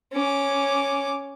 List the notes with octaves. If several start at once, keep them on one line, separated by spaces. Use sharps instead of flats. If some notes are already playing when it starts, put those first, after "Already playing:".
C#4 D6